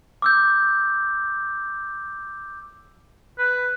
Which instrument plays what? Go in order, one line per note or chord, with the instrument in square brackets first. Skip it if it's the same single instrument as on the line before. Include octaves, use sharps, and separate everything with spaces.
[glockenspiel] D6 E6 G6
[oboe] B4